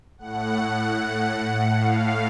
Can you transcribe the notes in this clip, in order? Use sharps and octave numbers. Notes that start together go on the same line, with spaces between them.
A2 F#5
A2 F5